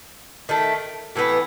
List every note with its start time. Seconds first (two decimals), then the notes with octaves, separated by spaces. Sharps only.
0.49 D#3 A3
1.16 A2 E3 B3